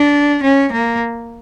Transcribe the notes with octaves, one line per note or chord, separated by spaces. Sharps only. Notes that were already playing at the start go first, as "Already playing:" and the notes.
Already playing: D4
C#4
A#3